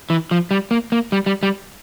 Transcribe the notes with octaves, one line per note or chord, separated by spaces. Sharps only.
E3
F3
G3
A#3
A#3
G3
G3
G3